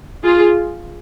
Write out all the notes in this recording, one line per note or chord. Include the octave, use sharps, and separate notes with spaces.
F4 G#4